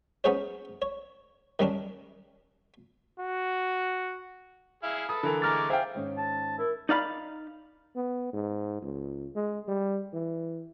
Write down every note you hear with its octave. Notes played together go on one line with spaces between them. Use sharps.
B3 C#4 D#4 G#4 C5 C#5
C#5
D#3 G3 C#4 D4
F#4
E4 G#4 F5
A4 B4 D#6
D3 E3 A#4
G#3 A3 A#5 D6 F6 A6
G#4 C5 E5 F5 G5
G#2 D#3 C#4
A5
E4 A#4
D#4 D5 F5 B5
B3
G#2
C#2
G#3
G3
E3